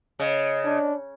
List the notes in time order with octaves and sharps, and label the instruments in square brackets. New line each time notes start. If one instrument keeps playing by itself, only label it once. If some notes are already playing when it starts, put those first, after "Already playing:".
[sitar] C#3 [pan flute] D#5
[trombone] D4